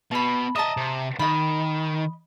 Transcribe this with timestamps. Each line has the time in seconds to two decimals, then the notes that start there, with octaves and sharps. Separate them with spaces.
0.11 B2 A5 B5
0.56 D#5 E5 A5 A#5 D#6
0.77 C3
1.19 D#3 D#5 B5